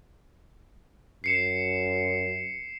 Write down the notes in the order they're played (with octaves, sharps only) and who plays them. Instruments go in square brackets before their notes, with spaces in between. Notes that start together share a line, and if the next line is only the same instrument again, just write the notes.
[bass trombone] F#2 [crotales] C7 C#7 E7